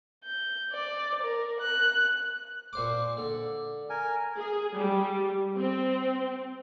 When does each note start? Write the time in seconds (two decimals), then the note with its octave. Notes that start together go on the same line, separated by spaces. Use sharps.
0.24 G6
0.73 D5
1.23 A#4
1.60 F#6
2.73 A#2 C5 D6
3.17 D3
3.90 A#4 G#5
4.37 G#4
4.76 G3
5.56 C4